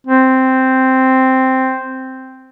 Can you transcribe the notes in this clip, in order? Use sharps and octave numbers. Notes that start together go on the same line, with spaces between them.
C4